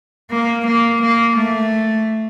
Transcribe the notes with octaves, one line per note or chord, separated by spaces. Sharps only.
A#3
A#3
A#3
A3